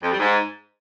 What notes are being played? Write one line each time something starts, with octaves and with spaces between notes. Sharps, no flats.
F2
G3
G#2